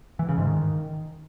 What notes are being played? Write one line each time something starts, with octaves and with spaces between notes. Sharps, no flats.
E3
C#3
G#2
D#3